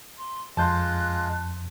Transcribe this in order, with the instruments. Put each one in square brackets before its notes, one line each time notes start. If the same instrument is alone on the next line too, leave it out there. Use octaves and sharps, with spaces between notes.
[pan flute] C6
[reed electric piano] F2 G6 [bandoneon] G#3 F4 [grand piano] A5 C6 [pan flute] F#6